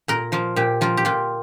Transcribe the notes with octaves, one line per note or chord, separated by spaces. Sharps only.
A#2 A#4
F3 A#3 F4
A#2 G4
F3 A#3 F4
G4
A#2 F4